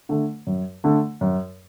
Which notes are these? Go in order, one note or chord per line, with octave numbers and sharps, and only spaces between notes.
D3 A3
F#2
D3 A3
F#2